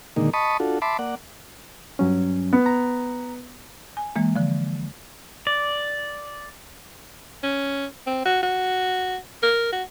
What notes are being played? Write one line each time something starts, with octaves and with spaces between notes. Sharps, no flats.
A#2 D3 D#3 G#3 A#3 D#4
D#5 A5 B5 C#6 D#6
D4 F4 F#4 A4
E5 A5 B5 C6 D6
A#3 D5 F#5
G2 F#3 C#4
B3
A#5
G#5
E3 G#3 A#3
D3 F3
D5
C#4
C4
F#4
F#4
A#4
F#4